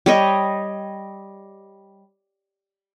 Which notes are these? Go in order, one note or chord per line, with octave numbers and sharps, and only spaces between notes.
G3 C#5 D#5